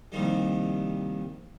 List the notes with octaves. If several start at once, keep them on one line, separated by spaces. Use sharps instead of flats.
C2 F2 A#2 D#3 G3